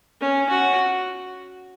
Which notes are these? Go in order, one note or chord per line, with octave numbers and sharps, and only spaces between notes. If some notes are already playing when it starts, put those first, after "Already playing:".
C#4
F#4